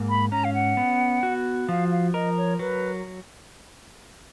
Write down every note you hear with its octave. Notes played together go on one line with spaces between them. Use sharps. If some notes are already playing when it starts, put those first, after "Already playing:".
Already playing: G#2 A#3
B5
C#4 A#5
F5
F#5
B3
F#4
F3 F5
F5
A#4 D#5
C#5
F#3 B4